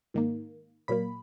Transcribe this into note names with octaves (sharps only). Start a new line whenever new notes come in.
G#2 D#3 A#3
A#2 F#3 A#3 B5